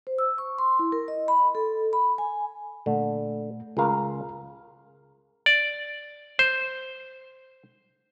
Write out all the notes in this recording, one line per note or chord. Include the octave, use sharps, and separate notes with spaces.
C5
E6
C#6
C6
E4
A#4
D#5
B5
A4
B5
G#5
A#2 D3 A3
C#2 G#4 A#4 F5
D5
C5